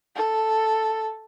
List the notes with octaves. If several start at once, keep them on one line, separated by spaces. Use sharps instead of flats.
A4